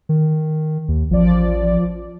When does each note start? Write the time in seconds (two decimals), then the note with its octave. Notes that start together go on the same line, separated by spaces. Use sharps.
0.09 D#3
0.88 D#2
1.11 A1 F3 D5